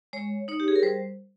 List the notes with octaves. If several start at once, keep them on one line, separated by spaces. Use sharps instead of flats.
G#3 C#5
D#4 C#5
G4
G#4
A#4
G3 C5